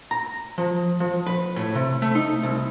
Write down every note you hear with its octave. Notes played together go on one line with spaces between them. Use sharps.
A#5
F3
F3
B4
A2
C3
A3
D#4
C2